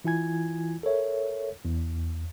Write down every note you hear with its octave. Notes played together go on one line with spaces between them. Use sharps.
E3 E4 F4 G#5 G#6
A4 A#4 C#5 E5
E2